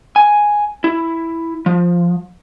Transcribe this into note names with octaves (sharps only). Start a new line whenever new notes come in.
G#5
E4
F3